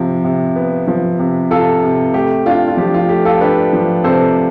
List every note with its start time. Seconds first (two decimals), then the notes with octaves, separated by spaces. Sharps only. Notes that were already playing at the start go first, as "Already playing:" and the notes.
Already playing: C3 F3
0.24 C3
0.56 B3
0.87 F3
1.19 C3
1.51 C3 F4 A4
1.83 C3
2.14 A3 G4
2.46 D4 F4
2.68 F4
2.77 F3 G4
2.94 F4
3.09 A3 G4
3.25 F4 A4
3.41 D4 G4 B4
3.73 F3
4.04 C3 A4 C5